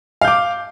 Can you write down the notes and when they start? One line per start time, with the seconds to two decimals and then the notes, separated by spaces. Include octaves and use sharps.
0.21 F5
0.25 G6
0.28 D6